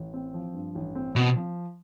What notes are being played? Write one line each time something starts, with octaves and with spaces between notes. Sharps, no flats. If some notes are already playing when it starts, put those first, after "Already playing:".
Already playing: A1
C4
F3
G2
A1
C4
B2 C4
F3